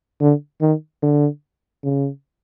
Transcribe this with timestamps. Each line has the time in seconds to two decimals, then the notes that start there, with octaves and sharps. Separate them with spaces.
0.21 D3
0.61 D#3
1.02 D3
1.84 C#3